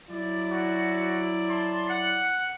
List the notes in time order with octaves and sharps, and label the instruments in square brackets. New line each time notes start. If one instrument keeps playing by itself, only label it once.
[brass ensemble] F#3 E4 D5
[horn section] F#4
A5 C6
F#5